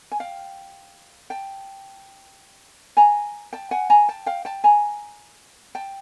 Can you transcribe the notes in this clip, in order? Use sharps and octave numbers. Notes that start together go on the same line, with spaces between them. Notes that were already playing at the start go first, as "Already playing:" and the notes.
G#5
F5 G5
G5 A5
G#5 A#5
G5 A5
F#5 G#5
G#5 A#5
G5 A5
F5 G5
G5 A5
G#5 A#5
G5 A5